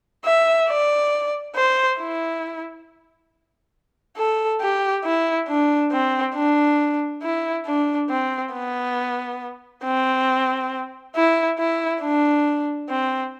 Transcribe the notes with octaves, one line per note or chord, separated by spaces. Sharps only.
E5
D5
C5
E4
A4
G4
E4
D4
C4
D4
E4
D4
C4
B3
C4
E4
E4
D4
C4